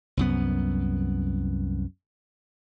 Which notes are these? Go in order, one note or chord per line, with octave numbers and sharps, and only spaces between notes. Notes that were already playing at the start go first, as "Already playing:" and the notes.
C2 F#2 B3